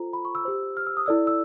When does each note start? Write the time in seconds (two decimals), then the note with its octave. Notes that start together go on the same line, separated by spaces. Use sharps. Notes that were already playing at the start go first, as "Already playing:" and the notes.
Already playing: F4 A4 C5 A#5
0.13 B5
0.25 C#6
0.35 E6
0.45 G4 C5
0.77 F6
0.87 E6
0.97 D#6
1.06 E4 A4 D5 E6
1.27 E6